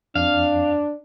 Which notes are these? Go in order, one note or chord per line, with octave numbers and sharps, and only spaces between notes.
F2 D4 F5